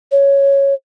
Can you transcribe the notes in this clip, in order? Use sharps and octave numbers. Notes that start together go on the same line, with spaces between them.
C#5